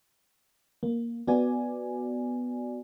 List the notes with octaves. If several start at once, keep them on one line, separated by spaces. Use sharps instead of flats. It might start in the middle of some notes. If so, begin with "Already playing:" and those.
A#3
B3 F#4 D5 G#5